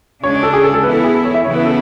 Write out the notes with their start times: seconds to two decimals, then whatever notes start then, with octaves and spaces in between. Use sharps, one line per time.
0.23 C#3 G#3 D4 C#5
0.34 C#5
0.43 A4
0.53 G#4
0.64 A4
0.74 A4
0.83 E3 B3 E4 B4
0.94 A4
1.04 G#4
1.14 A4
1.25 C#5
1.34 E5
1.44 C#3 E3 B3 E4 C#5
1.55 B4
1.65 A4